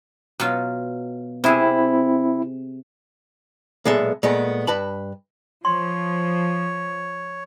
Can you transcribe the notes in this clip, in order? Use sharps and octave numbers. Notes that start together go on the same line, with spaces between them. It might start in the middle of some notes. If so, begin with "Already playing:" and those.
B2 F#3 F4
C3 C4 E4 G#4
B1 A#2 G#3 B3 A4 E5
A#2 G#3 A3 B3
G2 B4 A5 B5
F3 C#5 C6